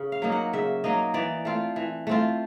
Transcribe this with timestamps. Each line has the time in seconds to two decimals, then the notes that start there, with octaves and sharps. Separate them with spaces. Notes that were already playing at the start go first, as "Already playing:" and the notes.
Already playing: C#3
0.12 F5
0.22 F#3 A#3 D#4
0.32 F#5
0.53 C#3 E5
0.84 F#3 A#3 D#4 D#5
1.14 E3 D5
1.45 A3 C4 F4
1.76 E3
2.07 A3 C4 F4